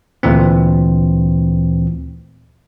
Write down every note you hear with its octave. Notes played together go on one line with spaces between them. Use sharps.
D2 A#2 E3 C4